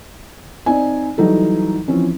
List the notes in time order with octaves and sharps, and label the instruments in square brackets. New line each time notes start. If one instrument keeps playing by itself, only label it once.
[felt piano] C4 D#4 D5 G#5
E3 F#3 G3 D#4 A4
E3 F3 C4 C#4